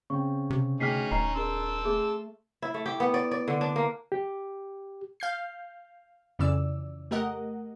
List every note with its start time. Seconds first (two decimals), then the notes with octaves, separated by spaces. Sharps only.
0.10 C#3 C4 G5 C#6
0.50 C3
0.80 D2 C#4 D#4 G#4 G5 F6 B6 C7
1.11 D#1 D#5 A#5 C7
1.35 D4 G#4 A#4 A5 C6 E6
1.85 A3 G#4
2.62 E4
2.74 A3
2.86 G4
3.00 B3
3.14 D5
3.31 D5
3.48 D3
3.61 D4
3.76 A#3
4.12 G4
5.20 F5 G6 C7
6.39 F2 C#3 E3 D5 E6
7.11 A3 G4 A#4 D#5 F#5